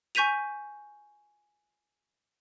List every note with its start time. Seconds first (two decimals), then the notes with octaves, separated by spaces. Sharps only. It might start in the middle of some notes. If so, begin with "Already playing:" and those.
0.15 G#5 C#6 G6 B6 D#7 F7